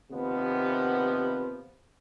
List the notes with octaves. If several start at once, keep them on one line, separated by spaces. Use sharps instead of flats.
D#2 C3 F3 B3